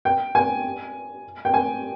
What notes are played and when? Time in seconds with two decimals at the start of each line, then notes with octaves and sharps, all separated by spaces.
0.05 G5
0.35 G#5
1.45 G5
1.54 G#5